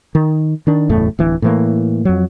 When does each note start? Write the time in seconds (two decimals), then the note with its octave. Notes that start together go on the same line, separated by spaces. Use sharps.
0.15 D#3
0.67 D#3 D4
0.89 F#1 E2 A2 A3
1.19 D1 E3
1.42 A2 E3 A#3
2.05 F2 F#3